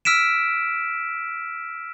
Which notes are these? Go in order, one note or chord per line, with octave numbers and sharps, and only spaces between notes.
E6 F6 B6 D7 E7